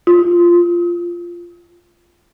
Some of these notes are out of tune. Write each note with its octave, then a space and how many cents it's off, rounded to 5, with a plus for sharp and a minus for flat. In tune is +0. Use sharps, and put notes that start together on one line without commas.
F4 -10